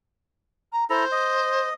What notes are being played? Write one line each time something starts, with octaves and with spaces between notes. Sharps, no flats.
A#5
E4 A4 C5 A#5
D#5